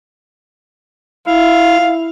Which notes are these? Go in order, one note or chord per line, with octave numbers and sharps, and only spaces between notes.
E4 F5